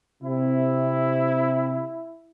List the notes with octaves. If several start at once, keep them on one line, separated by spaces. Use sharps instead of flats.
C3 E4